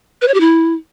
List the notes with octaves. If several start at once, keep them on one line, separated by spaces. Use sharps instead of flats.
B4
C#5
G4
E4